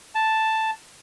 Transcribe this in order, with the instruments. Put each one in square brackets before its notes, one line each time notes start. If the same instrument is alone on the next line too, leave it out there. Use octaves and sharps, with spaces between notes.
[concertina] A5